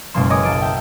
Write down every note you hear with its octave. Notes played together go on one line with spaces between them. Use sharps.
F#1 B2 G#3 A#3 C6 E7
A#4 C#5 D#5 G#5 D6 D#6
B1 A#3 A5 D#6 D7 D#7
E5 G5